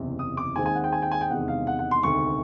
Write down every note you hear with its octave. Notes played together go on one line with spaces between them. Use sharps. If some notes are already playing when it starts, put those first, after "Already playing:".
Already playing: F#1 E2 C3
D#6
D6
D#2 D#3 G#3 C4 G#5
G#5
F#5
G5
G#5
G5
G#5
G5
E1 E2 C3 D#3 G#3 F#5
F5
F#5
F#5
C6
E1 D2 C3 D#3 C#6